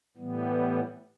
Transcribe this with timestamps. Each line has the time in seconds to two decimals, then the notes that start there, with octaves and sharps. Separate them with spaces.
0.17 A2 E3 G3 B3